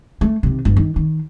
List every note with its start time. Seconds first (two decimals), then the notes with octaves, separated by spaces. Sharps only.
0.21 A3
0.43 C3 D#3
0.65 G1
0.76 D#3
0.96 D#3